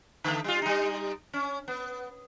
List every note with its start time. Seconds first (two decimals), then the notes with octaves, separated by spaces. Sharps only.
0.24 D3 A3
0.44 G3 F4
0.62 G3 D#4
1.33 C#4
1.68 B3